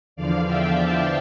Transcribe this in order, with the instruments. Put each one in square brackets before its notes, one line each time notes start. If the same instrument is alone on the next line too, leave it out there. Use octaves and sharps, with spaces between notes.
[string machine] E2 D3 F3 D5 F5
E5 G5
F5 A5